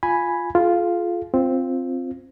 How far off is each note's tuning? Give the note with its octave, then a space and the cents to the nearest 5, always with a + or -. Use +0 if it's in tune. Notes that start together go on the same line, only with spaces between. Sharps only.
F4 +0 G#5 +0 B5 +0
F4 +0 G#4 +45
C4 +0 F4 +0